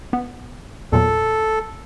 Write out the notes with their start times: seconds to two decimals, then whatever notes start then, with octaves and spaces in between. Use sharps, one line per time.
0.13 B3
0.92 E2 A#2 F#3 A4